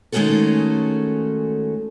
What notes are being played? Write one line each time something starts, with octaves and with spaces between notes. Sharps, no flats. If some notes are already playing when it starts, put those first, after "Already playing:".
D#3 G#3 A3 C#4 F#4 A4